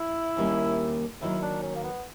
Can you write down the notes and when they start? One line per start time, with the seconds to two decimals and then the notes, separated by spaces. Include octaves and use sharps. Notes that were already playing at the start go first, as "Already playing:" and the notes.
Already playing: E4
0.37 D#2 D#3 G3 A#3 C#4
1.21 D#2 D#3 F#3 E4
1.42 D4
1.63 C#4
1.75 A#3
1.84 B3